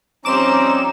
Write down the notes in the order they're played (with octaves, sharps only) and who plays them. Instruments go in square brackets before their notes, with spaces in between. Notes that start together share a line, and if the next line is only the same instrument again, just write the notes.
[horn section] F3 G3 C4 [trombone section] C#4 D#4 [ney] A#5 [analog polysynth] D6 E7